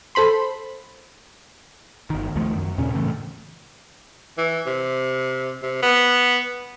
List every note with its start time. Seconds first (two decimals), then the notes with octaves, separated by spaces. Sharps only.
0.15 A4 C5 B5 C6
2.10 G1 D#3
2.36 C#2 D#3 F3 A3
2.56 F#2
2.78 D#2 A#2 C#3 C#4
2.94 A2 C#3 E3 A3
4.38 E3
4.66 C3
5.62 C3
5.82 B3